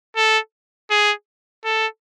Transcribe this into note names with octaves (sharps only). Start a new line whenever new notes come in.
A4
G#4
A4